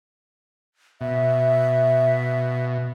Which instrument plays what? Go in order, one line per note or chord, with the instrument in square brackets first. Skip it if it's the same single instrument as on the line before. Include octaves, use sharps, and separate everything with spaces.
[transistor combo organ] B2 [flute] E5